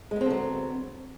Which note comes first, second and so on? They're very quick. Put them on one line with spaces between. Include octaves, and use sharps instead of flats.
G#3 B3 C4 D3 F#3